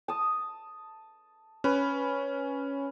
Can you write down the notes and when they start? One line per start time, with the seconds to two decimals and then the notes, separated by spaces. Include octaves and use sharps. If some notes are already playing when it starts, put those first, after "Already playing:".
0.08 A5 D#6
1.64 C#4 B4